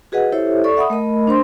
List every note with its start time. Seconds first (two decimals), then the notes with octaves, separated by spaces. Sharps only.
0.12 F#4 G#4 B4 D#5 F#5
0.32 E4 G4 A4 C5 C#5 E5
0.64 A4 D5 C#6
0.77 E5 F#5 B5 D#6
0.90 A3 A#4 D#5 B5
1.27 D4 C5 C6